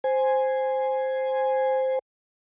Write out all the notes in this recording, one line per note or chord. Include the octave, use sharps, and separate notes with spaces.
C5 G#5